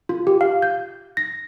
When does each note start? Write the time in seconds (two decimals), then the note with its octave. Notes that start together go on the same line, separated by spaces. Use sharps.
0.09 F4
0.27 G4
0.41 F5
0.62 G6
1.17 A#6